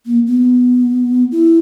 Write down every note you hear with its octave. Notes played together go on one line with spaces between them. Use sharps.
A#3
B3
E4